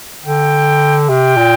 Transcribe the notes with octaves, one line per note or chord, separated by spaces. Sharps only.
D3 G5
C3 G5
A#2